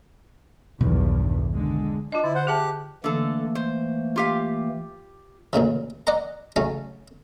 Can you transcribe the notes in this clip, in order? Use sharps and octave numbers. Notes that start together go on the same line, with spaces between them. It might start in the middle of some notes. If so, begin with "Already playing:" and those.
B1 E2 G2 B2 D#3 E3
D3 G#3
D4 F4 D#5
D3 E4
C5 F#5
G4 G#4 E5 A5 F#6
D3 E3 A3 A#3 A4
C5
F4 G4 F5
D2 A#2 C#3 E3
D5 D#5 F#5 A#5
C#3 F#3 A3 C#4